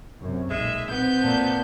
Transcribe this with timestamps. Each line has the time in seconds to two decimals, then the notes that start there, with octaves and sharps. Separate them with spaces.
0.21 F#2 C3
0.50 B1 A#2 G#3 E5
0.91 B3 C4 G6
1.21 A#2 A5